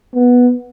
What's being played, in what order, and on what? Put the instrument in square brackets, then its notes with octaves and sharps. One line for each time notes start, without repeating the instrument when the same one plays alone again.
[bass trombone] B3